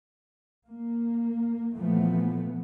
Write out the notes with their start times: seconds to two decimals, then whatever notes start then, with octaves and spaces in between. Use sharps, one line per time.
0.68 A#3
1.75 A#2 E3 F3 A3 B3